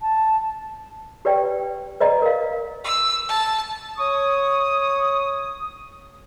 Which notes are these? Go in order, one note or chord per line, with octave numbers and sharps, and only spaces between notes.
A5
G4 B4 D5 G5
B4 D5 D#5 A#5
A#4 F5
E6
A5
C#5 C#6 D#6